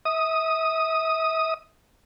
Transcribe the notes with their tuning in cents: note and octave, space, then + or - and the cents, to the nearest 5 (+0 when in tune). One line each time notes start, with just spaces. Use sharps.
E5 -35 D#6 +0